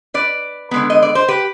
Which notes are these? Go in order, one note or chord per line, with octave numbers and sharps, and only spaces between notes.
B4 D5
D3 G#3 B3
D#5
D5
C5
G4 B4